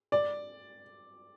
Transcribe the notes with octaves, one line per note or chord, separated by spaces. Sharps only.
D5